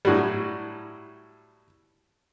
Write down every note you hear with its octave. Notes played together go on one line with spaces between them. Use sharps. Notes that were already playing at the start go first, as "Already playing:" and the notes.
A2 F#3 G3